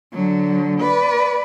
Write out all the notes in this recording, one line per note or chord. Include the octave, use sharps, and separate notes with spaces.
D3 F#3
B4 D5